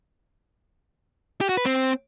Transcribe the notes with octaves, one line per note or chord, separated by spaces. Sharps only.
G4
F#4
B4
C4